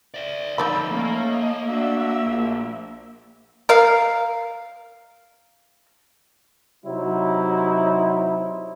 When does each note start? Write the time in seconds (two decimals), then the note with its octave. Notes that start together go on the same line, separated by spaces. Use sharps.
0.14 D5 E5
0.58 D3 F3 D#4 D5 B5 E6
0.91 A3 A#3 C#4 A#4
1.29 D#5
1.68 D4 F#4 E5
2.25 A#1
3.69 A#4 F5
6.85 C3 F#3 D#4 E4 C5